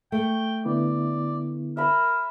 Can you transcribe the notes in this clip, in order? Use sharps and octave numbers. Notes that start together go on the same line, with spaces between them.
A3 G5
D3 B3 E4 D5
A#4 E5 B5